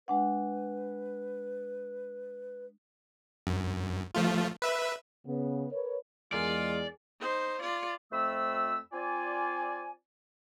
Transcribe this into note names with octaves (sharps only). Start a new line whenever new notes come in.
G#3 D4 B4 F#5
F#2
F3 A3 F4
B4 E5
C#3 B3
A#4 B4 C#5
E2 G#3 F4 G#4 A#4 D5 G#5
D#4 C5
F4 D5
F2 F3 A3 C4 B5 E6
C4 F4 D5 G#5